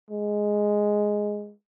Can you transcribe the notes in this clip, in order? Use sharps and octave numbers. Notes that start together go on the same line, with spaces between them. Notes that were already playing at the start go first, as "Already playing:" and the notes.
G#3